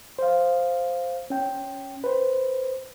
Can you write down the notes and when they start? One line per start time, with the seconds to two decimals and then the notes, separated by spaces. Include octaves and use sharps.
0.19 C5 F5
1.30 C#4 G5
2.04 B4 C5